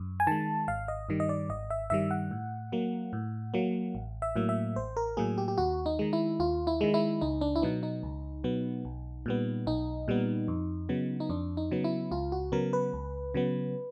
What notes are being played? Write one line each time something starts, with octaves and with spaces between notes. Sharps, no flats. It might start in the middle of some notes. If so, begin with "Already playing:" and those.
Already playing: F#2
G#5
D#3 G#3 A5
G#1 F5
D#5
G2 D#3 G3
D#5
D5
G#1 D#5
E5
G2 D#3 G3 E5
F#5
A2
F#3 A#3
A2
F#3 A#3
A1
E5
A2 F#3 A#3
E5
A1 C5
A#4
A2 F#3 A#3 G#4
G4
G4
D#2 F#4
D#4
D#3 G#3
E4
D#2 F4
E4
D#3 G#3
E4
C#2 D#4
D4
E4
B2 F#3 B3 D#4
D#4
C#2
B2 F#3 B3
B1
A#2 G3 B3
B1 D#4
A#2 G3 B3
F2
C#3 F#3 B3
D#4
F2 D4
D#4
C#3 F#3 B3
E4
C#2 F4
F#4
C#3 F#3 B3 A#4
B4
C#2
C#3 F#3 B3